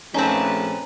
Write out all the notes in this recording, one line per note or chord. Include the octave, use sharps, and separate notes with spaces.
A#1 A3 C4 C#4 D#4 B4 A5